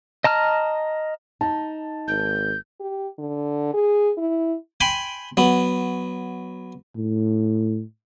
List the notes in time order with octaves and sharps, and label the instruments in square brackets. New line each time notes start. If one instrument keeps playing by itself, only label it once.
[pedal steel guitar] D#5 A5 A#5 F6
[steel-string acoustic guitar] D#4 [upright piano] A5
[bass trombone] G#1 [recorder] G6
[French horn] G4
D3
G#4
E4
[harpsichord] G5 G#5 B5 C6
F#3 B3
[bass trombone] A2